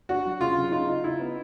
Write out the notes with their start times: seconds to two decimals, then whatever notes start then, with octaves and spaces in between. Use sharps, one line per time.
0.09 D4 F#4
0.25 F#3
0.40 C#3 F4
0.57 C#3
0.72 D#4 F4
0.88 D#4
1.04 D#4 E4
1.20 B3